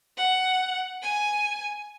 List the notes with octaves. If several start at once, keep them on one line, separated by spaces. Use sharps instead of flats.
F#5
G#5